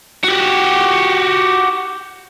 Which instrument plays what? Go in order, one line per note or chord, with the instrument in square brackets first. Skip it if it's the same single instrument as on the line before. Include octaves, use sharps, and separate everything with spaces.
[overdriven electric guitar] F#4 G4